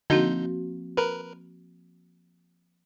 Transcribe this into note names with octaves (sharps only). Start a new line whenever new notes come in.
D3 F3 A#3 C4 D#4 F#4 G6
A#4 B4